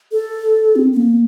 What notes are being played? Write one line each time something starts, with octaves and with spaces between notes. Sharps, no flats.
A4
C4
C4
A#3